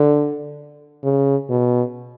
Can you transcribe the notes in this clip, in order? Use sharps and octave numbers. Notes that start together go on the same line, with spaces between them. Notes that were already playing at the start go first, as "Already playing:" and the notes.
Already playing: D3
C#3
B2